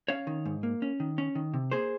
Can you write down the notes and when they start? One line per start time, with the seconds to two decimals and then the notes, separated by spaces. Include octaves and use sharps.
0.08 C#4 C#5 F5
0.27 D#3
0.46 G#2
0.63 A#3
0.82 C#4
1.00 D#3
1.18 C#4
1.35 D#3
1.54 C3
1.72 A#3 G#4 C5